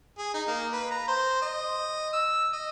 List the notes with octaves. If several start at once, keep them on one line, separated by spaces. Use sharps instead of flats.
G#4
D#4
A#3
B4
A#5
C5
D#5
E6
D#5